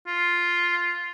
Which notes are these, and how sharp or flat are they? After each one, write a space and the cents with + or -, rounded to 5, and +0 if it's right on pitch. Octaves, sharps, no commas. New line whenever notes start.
F4 +0